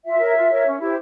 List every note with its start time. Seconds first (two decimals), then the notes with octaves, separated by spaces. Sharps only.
0.05 F4 E5
0.20 A#4 C#5
0.35 F4
0.50 A#4 C#5
0.65 C#4
0.80 E4 G4 C5